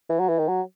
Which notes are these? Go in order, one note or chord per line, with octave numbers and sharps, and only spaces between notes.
E3
F#3
E3
D#3
F#3